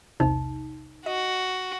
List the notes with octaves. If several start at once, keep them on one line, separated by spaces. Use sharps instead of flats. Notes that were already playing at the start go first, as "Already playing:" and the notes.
B1 E2 C3 D#4
F#4 D#5